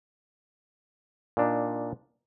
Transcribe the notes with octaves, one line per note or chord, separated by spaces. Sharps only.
A#2 D4 D#4